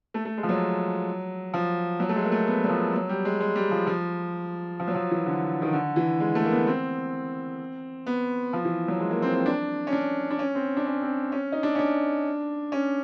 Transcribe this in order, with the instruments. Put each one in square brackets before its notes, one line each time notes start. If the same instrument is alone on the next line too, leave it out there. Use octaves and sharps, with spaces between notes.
[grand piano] A3
A3
G#3
F3
F#3
F3
F#3
A3
G#3
A#3
A3
B3
F#3
F3
F#3
G3
G#3
G#3
G3
F3
F3
F3
F#3
F3
E3
D3
D#3
D3
E3
G#3
A3
A#3
B3
C4
B3
F3
E3
F#3
G#3
A#3
C4
C4
D4
C#4
D4
D4
C#4
C4
D4
C#4
C4
C#4
D#4
D4
C#4
D4
C#4